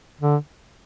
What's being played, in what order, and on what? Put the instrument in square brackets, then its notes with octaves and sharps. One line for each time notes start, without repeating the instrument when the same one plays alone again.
[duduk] D3